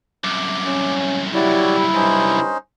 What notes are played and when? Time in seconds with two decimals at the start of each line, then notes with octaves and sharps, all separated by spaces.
0.24 C2 F#2 D6
0.66 C#4
1.34 G3 E4 F#4 C#5 D5
1.95 G2 C#4 D#4 C5